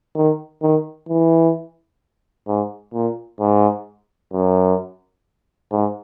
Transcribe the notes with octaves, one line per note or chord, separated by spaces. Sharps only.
D#3
D#3
E3
G#2
A#2
G#2
F#2
G#2